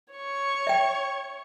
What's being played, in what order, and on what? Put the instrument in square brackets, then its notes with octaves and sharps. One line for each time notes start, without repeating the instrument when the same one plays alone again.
[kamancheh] C#5 C#6
[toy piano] E5 G5